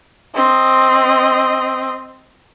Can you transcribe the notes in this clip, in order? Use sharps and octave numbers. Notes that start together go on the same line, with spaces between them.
C4 D#5